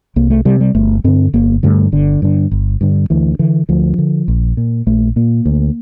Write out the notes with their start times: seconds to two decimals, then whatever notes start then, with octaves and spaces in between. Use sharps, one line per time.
0.16 C2 A#3
0.30 A3
0.45 C3 G3
0.60 G3
0.75 G1 A3
1.04 G2 D3 C4
1.34 G1 A#3
1.63 G2 D3 A3
1.92 G1 D3
2.22 G2 D3
2.51 G1
2.81 G2 D3
3.10 D2 E3
3.39 D3 E3
3.69 D2 F3
3.98 D3
4.28 A#1
4.57 A#2
4.87 A#1 A3
5.16 A#2 A#3
5.45 D2